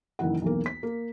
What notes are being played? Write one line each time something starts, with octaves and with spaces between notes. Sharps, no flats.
F#1 F#2 D#3 E3 E4 F#5
B1 E2 A#3
B6
A#3